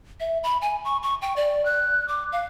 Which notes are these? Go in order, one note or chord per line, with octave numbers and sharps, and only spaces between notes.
E5
B5
G#5
C#6
C#6
G5
D5
F#6
D6
F5